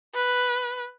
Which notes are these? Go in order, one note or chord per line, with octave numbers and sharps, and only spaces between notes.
B4